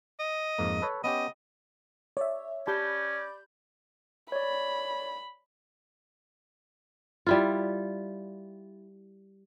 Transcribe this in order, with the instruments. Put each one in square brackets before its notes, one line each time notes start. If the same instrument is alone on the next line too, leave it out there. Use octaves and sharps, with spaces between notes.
[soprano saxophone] D#5
[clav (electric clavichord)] F2 G#2 A#3
A4 B4 C#5
[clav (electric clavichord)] B3 C#4 G4 [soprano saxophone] D#5
[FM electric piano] C#5 E5 [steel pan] D5
[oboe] C#4 [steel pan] G4 A5 [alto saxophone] D5 [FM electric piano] B5 G6
[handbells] C#5 D5 [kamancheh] B5
[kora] G3 E4 F4